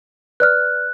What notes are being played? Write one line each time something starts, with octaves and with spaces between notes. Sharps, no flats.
B4 D5 F6 F#6